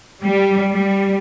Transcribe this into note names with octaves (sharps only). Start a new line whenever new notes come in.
G3
G3